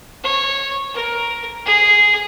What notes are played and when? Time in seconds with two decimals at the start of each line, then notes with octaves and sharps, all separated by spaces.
0.24 C#5
0.94 A#4
1.65 G#4